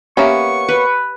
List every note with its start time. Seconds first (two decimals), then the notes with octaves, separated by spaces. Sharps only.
0.17 A#3 B3 C#4 G4 C#5 E5 C#6
0.69 B4